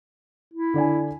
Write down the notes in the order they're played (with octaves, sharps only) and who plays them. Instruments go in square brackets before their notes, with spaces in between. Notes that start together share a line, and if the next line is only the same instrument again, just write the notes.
[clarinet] E4
[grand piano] D3 D5 G#5